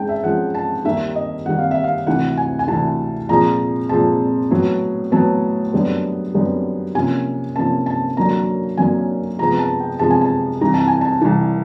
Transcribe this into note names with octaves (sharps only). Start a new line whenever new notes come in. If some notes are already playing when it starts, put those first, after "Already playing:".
Already playing: G#2 G#3 C#4 G5 A5
E5
G#2 F3 G#3 C#4 F#5
A5
D#2 D#3 G3 A#3 E5
D#5
D#2 D#3 G3 A#3 F#5
F5
E5
F5
D2 C3 E3 F#5
G#5
G#5
D2 C3 E3 A5
A#2 F3 G#3 C4 A#5
A#2 F3 G#3 C4 A5
A2 F#3 B3
A2 F#3 B3 A5
F#2 D3 G3 B3
F#2 D3 G3 B3
C3 F3 A#3 C#4 G#5
C3 F3 A#3 C#4 A5
A5
F#2 D3 F#3 A#3 A#5
F#2 D3 F#3 A#3 G#5
C3 F3 G#3 B3 A#5
A5
G5
C3 F3 G#3 B3 A5
G#5
A5
C2 C3 E3 A#5
A5
G#5
A5
C2 C3 E3 A5